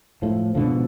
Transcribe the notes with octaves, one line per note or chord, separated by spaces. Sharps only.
A2 F3
G#2 B2 D3 F3